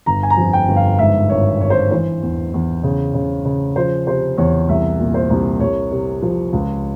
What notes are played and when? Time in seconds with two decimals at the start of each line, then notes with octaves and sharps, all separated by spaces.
0.06 G1 A#5
0.23 G#5
0.30 A#5
0.37 F2
0.53 G5
0.68 G1
0.76 F5
0.99 G#2 E5
1.30 G#1 C#5
1.61 G#1 C#5
1.70 C5
1.91 E3 C5
2.22 E2
2.54 E2
2.83 C#3
3.14 C#3
3.45 C#3
3.76 F3 C5
4.07 C3 C5
4.38 E2 C#5
4.69 C2 E5
4.99 A#2
5.14 C5
5.30 C2
5.60 C2 C#5
5.91 C3
6.22 F3
6.53 C#2